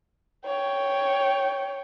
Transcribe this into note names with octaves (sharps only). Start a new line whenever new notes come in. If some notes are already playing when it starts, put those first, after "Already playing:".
C#5 G5